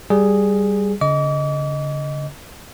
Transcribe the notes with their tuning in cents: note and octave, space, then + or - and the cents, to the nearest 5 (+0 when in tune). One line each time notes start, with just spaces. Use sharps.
G3 +0 G#4 +0
D3 -45 D#5 +5 D6 -40